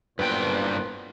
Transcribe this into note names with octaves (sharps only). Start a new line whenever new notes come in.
F#1 G2 A#2 B3 B4 C5 G5